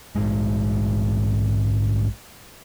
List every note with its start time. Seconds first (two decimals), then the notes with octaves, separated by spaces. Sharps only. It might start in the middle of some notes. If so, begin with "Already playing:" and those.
0.16 A#1 G#2 G#3